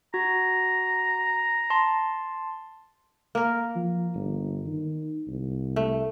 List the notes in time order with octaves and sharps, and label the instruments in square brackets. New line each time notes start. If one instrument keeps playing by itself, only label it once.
[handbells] F#4 [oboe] A#5
[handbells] A5 C6
[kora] A#3 A#4
[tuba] F3
G1
D#3
C2
[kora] A3